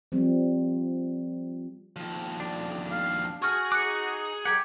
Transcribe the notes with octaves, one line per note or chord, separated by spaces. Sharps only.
F3 G3 C4
D#2 F3
D4
F5
F#4 G#4 G#5 C#6 F6
D#4 D6 F#6 C#7
G3 G4 A#4 F#5 G#6